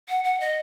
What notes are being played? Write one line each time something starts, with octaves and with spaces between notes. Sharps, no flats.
F#5
F#5
D#5